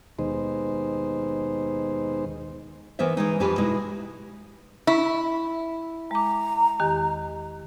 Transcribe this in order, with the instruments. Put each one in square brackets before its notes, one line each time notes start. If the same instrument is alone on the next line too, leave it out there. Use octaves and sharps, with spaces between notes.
[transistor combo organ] D#2 B2 G#3 D#4 C5
[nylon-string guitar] E3 B3 A#4 C5 E5
E3 G#3 D#4
F2 F3 G4 B4 G#5
B2 G#3 D#4 E4 F#4
[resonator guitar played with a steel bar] E4 [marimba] C#6
[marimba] G#3 D6 [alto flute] A#5
[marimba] E2 D#3 G4